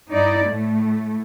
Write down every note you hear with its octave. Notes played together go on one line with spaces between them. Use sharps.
G2 D#4 E4 D5
A2 A3